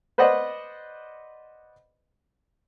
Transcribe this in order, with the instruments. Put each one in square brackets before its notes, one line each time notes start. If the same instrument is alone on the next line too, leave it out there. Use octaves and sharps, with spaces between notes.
[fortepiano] B4 C5 D5 D#5 F#5